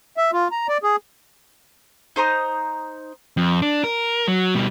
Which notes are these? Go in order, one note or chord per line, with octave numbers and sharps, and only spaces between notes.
E5
F4
A#5
D5
G#4
D#4 C5 A#5 D#6
F2
D4
A#4
F#3
B2 G3